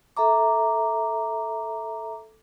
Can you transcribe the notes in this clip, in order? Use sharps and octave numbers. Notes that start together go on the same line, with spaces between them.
A4 E5 A#5 D6